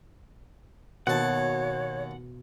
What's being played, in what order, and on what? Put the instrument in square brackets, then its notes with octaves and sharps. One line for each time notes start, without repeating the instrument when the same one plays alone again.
[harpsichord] D#2 A5 [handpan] B2 [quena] C#5 [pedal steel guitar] F#5